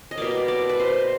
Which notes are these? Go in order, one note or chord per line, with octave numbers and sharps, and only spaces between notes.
D#5
B2 G3 A#3 D5
D5
B4
C5